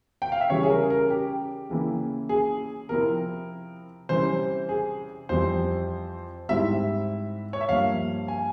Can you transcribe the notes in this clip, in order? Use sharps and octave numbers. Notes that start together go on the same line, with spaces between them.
G5
F5
E5
C#3 E3 G3 C#5
G#4
A#4
A#4
G4
C#3 E3 A#3 E4
G#4
C3 F3 C4 E4 A#4
C3 E3 G3 C#4 E4 C5
G#4
F2 E3 G3 C4 C5
G#2 G3 C4 E4 E5
C#5
E5
G2 F3 A#3 F5
G#5